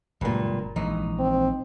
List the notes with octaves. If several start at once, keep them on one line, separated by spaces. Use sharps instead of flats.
F#1 G2 A#2 G#3
A#1 E3 G#3 D#4
C4